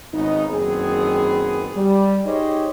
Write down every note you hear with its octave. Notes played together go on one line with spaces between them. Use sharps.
G#1 C#3 B3 D#4
F#1 D#3 B3 C4 G#4
G3
D#4 G4 G#4 C5 C#5 D#5